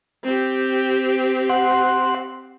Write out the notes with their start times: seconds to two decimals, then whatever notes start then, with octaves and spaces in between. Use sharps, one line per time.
0.24 C4 G4
1.49 F#5 C6